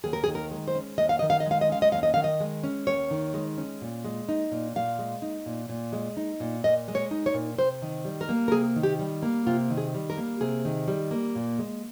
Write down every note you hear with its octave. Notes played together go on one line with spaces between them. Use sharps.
D#2 G#4
A#4
G#4
D#3
A#4
G#3
C5
C#4
D#2 D#5
F5
D#3 D#5
F5
D#5
G#3
F5
D#5
C#4 F5
D#5
D#2 F5
D#5
D#3 F5
D#5
G#3
C#4
D#2 C#5
D#3
G#3
C#4
A#2
G#3
D#4
A#2
A#2 F5
G#3
D#4
A#2
A#2
G#3
D#4
A#2
A#2 D#5
G#3
C#5
D#4
C#5
A#2
C3 C5
D#3
G3
A#4
A#3
A#4
C3 G#4
D#3
G4
G3
A#3
C3 F4
D#3
G#4
G3
A#4
A#3
C3 G#4
D#3
G3
A#3
A#2
G#3